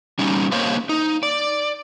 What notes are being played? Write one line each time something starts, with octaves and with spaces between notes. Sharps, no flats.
G3 C#4 D#4
A#3 C5 C#5 D#5 F5
D#4
D5